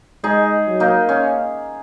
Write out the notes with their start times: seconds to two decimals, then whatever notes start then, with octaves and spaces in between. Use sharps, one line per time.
0.24 G#3 D#4 G#4
0.67 F#3
0.80 A#3 D#4
1.09 C#4